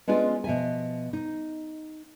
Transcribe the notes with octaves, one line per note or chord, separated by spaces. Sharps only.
G#3 B3 C#4 D4 F4 G#4
B2 F3 E5 G#5
D#4